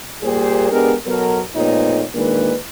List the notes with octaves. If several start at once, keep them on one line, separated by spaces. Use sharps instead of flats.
A#2 G3 A#3 G4 G#4 C5
G#3 B3 D4 G4 A#4
B2 F#3 B3 A4 A#4
F2 A#2 A3 B3 D#4 C#5
A#2 D#3 G#3 A#3 D4 B4